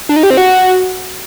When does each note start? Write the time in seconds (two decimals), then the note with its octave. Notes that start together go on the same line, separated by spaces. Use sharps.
0.09 D4
0.16 D#4
0.23 G4
0.30 C4
0.37 F#4